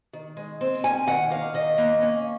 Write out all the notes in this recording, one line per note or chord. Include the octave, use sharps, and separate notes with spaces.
D#3
G#3
C4
C#4 G#5
D#3 F#5
A#3 F5
D#3 D#5
A#3
C#4